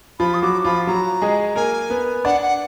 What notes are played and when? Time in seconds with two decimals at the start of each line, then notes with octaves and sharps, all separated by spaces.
0.19 F3 F4 B5
0.34 D#6
0.42 F#3 F#4 D6
0.64 F3 F4 B5
0.87 F#3 F#4 A#5
1.22 G#3 G#4
1.56 A#3 A#4 G#5
1.90 B3 B4
2.25 D4 D5 F#5
2.42 F#5